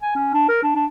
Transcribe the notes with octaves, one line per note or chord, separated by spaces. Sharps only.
G#5
C#4
D4
A#4
D4
D4